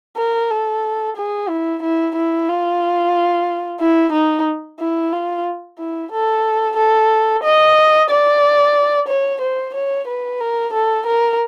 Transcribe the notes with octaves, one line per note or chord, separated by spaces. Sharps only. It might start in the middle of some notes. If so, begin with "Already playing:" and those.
A#4
A4
G#4
E4
E4
E4
F4
E4
D#4
E4
F4
E4
A4
A4
D#5
D5
C#5
C5
C#5
B4
A#4
A4
A#4